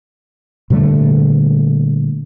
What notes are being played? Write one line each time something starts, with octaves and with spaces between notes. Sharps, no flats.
A#2 D3 G3 A3